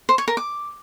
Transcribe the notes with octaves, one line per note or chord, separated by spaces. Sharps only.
C5
C#5
A#4
D6